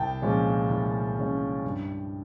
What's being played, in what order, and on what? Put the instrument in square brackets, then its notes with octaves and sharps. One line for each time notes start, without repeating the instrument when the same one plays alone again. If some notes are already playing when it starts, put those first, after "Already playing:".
Already playing: [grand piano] C2 G5 A5
A#2 F3 G#3 C#4
C2
A#2 F3 G#3 C#4
G2